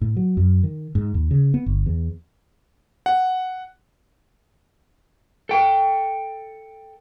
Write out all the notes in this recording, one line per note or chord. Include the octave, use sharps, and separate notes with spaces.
A2
F#3
F#2
D#3
G#2
D#2
C#3
B3
G1
E2
F#5
A4 G5